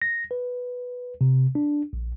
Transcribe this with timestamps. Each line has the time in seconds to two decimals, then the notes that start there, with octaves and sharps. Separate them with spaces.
0.02 A#6
0.31 B4
1.21 C3
1.55 D4
1.93 A#1